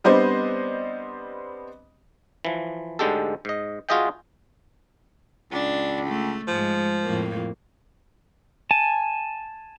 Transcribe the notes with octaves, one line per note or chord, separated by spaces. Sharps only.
G3 B3 C4 D4 C5 D#5
E3 F3
D2 G#2 D3 G#3 G4 A4
G#2 D#5
F4 F#4 G#4 D#5 E5 G5
C#2 D4
A3
G#2 F3 G#3
F2 A2 A#3
G#5 A5